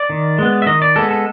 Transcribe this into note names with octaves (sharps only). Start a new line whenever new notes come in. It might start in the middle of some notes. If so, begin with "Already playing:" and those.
Already playing: D5
D#3
G#3 B3
E5
D#3 D#5
D5
G#3 B3 A4
A4